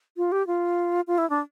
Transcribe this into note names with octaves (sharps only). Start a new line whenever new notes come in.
F4
G4
F4
F4
E4
D4